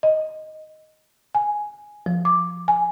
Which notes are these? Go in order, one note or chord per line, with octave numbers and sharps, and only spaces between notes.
D#5
G#5
F3
D6
G#5